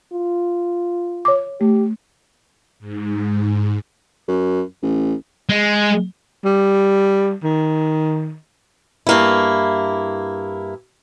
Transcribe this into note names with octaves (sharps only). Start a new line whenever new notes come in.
F4
C#5 D6
A3 G4
G#2
F#2
A1
G#3
G3
D#3
G2 A#3 E4